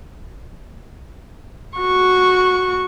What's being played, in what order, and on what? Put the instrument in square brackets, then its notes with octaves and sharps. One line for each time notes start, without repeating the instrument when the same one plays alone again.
[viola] F#4 C#6